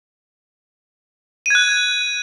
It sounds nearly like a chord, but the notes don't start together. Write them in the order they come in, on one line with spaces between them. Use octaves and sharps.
D#7 G#6 F#6